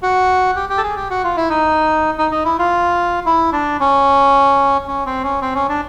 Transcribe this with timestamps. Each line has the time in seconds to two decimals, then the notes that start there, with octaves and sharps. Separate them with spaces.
0.02 F#4
0.56 G4
0.69 G4
0.78 A4
0.83 G#4
0.96 G4
1.10 F#4
1.24 F4
1.37 E4
1.50 D#4
2.18 D#4
2.31 D#4
2.45 E4
2.59 F4
3.26 E4
3.53 D4
3.80 C#4
4.88 C#4
5.06 C4
5.23 C#4
5.42 C4
5.55 C#4
5.69 D4